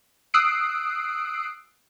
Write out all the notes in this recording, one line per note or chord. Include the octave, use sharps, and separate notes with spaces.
D#6 E6 F#6 C7 D7